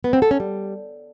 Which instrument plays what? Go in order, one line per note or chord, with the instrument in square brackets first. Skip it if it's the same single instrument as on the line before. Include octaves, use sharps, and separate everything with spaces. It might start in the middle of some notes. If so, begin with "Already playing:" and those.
[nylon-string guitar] B3
C4
A4
C#4
G3